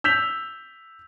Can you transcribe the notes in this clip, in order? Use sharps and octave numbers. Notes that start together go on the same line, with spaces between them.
E6 G6 B6 F7